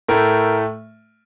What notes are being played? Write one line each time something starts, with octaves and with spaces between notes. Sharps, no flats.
A2 A3 A#4